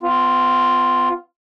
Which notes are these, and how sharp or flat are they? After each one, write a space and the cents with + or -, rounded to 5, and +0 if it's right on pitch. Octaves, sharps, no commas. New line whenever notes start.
B3 +40 F4 +0